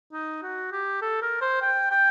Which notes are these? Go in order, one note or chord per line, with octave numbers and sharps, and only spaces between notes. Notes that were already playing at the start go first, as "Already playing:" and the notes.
D#4
F#4
G4
A4
A#4
C5
G5
G5